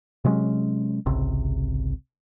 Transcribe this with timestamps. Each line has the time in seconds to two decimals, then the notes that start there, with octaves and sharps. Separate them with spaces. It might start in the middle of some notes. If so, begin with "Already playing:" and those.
0.25 C3 F#3 G#3 C#4
1.06 G#1 C#2 C3